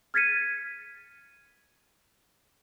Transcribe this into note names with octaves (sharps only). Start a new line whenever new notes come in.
F6 G#6 A6 B6 C#7 D#7